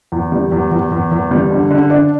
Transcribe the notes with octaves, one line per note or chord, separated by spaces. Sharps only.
E2
G3
E2
E2
E2
E2
G3
D3
D3
D4